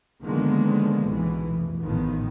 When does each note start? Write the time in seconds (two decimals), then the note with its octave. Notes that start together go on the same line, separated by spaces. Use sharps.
0.24 D3 D#3 F3 G#3 A#3 B3
1.05 B1 B2 E3
1.49 F1
1.80 A1 A2 D#3 F3 B3